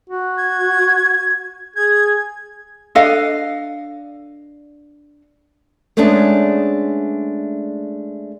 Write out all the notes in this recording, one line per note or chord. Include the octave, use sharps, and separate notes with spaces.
F#4
G#6
G#4 G#6
D4 A4 D#5 F5
G#3 A3 B3 C#4 D4 G#4